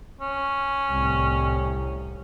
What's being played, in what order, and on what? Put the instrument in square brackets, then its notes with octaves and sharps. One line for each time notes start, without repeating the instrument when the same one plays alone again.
[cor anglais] C#4
[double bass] C2 A2